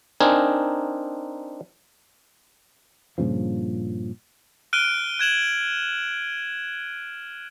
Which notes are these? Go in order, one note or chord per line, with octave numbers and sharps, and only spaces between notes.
C4 D4 D#4 A#4 G#5
G2 A#2 C#3 F3
F6 F#6 D7 D#7 G7
F#6 G#6 E7 F#7